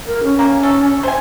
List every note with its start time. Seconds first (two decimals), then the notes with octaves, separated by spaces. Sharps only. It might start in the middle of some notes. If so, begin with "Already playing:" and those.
0.07 A#4
0.23 C#4
0.39 A#3
0.63 A4
1.03 C5 G#5